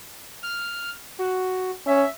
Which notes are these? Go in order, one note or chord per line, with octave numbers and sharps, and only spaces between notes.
F6
F#4
C#4 E5